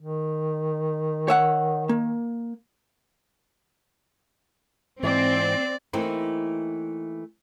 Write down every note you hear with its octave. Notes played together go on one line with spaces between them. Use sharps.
D#3
C#5 E5 F#5
A#3
G#2 E3 C4 D5
E3 A3 A#3 C4 D#4 E4